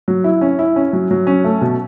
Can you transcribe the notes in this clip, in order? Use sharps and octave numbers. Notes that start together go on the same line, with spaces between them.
F#3
E4
C#4
E4
C#4
F#3
F#3
C#4
A3
B2